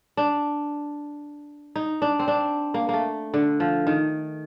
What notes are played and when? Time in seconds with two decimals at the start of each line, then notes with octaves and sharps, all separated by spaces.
0.17 D4
1.76 D#4
2.02 D4
2.19 C4
2.28 D4
2.74 A#3
2.89 A3 A#3
3.34 D3
3.60 F3
3.87 D#3